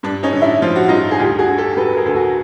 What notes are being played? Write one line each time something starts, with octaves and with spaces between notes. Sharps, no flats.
G2 D4
C#4 D#4
D3
D4 E4
F3 F4
F#4
G2 D#4 F4
G#4
D2 F4 G4
F#4 G#4
D3
G4 A4
F#3 A4 B4
G#4 A#4
D2 A4
F#4 G#4